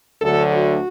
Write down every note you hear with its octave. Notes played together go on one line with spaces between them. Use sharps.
D2 D3 F#3 A3 A4
F#4